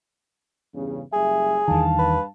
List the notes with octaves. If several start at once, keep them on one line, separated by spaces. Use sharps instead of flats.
E2 G2 C#3
F#1 G3 G#4 E5
E2 G2 D#3 F5 A5
B4